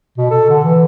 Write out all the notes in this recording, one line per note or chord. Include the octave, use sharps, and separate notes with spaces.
B2
A4
D3
E3